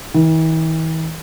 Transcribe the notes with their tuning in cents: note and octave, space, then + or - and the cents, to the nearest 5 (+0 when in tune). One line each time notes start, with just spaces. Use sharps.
E3 -45